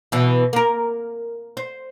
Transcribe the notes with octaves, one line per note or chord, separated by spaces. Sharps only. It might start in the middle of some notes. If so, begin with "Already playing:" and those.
B2 E3
A#3 A#4
C5